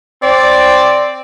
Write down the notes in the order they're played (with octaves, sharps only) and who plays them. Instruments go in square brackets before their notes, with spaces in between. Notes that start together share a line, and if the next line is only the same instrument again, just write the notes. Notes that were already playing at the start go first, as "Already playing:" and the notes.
[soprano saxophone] C4 [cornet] D5